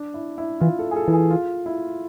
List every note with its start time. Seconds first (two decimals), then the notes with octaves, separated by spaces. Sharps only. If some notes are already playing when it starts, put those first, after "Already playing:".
Already playing: D4
0.14 E4
0.38 E4
0.60 E3 F4
0.79 A4
0.91 G#4
0.96 A4
1.08 E3
1.13 G#4
1.30 F4
1.66 E4